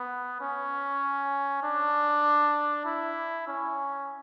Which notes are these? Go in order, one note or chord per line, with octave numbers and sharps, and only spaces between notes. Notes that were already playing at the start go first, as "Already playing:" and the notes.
Already playing: B3
C#4
D4
E4
C#4